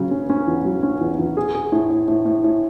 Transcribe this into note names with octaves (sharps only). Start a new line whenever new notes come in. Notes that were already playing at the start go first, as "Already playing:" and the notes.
Already playing: C#3 F#3 C#4
C#4
C#4
E2
F#3
C#4
E2
E2
G#4
G#4
A2
A2
A2
A2
A2